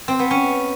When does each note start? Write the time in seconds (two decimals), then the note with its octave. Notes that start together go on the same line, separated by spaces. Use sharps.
0.08 C4
0.19 B3
0.31 C#4